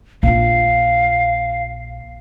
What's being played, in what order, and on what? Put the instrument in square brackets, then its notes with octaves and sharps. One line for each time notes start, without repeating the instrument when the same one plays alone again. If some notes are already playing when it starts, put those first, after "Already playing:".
[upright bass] A#1 F4 [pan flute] F5